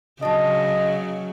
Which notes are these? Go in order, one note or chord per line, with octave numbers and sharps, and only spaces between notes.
C#3 F#3 D4 F#4 D#5